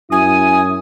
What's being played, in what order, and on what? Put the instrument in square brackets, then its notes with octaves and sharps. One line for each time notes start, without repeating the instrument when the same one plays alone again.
[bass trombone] F#2 [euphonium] E4 [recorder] G#5 [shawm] D#6